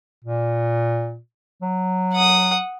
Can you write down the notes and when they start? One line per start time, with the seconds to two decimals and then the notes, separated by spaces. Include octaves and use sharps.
0.25 A#2
1.62 F#3
2.13 F#5 D#6